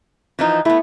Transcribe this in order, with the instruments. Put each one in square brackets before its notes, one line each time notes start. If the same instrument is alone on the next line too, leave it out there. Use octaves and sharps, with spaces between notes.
[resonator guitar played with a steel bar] E3 F3 D#4
[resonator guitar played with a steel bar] A3 B3 [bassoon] E4